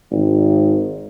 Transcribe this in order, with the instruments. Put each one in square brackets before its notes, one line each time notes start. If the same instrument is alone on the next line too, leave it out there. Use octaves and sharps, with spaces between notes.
[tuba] G#1